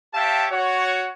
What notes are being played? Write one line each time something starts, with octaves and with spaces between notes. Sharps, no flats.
G4 C#5 E5 F5 G5 A5
F#4 C#5